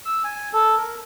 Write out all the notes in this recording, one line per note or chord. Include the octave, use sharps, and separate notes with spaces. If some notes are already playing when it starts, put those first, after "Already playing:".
E6
G#5
A4
A#4